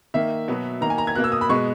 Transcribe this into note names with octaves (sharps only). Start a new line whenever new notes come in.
D#3 A#3 E5
B2 F#3 B3
D#3 A#3 A#5
G#5
A#5
G#6
B2 A#3 F#6
E6
D#6
B5
B2 G#3 B3 C#6